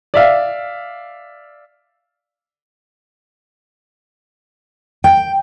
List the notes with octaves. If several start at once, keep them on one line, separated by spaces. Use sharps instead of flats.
D5 E5 F5
G5